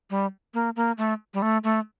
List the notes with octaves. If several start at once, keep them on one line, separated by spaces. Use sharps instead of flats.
G3
A#3
A#3
A3
G3
A3
A3